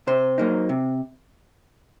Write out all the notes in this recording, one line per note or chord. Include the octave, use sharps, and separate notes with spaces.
C3 C5
F#3 A#3 D#4
C3